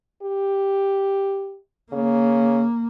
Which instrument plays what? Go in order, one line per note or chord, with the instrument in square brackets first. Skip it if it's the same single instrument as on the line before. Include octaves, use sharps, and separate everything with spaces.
[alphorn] G4
[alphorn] C#3 [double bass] A#3